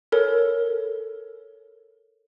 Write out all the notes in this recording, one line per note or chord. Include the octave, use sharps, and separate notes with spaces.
A4 A#4 C#5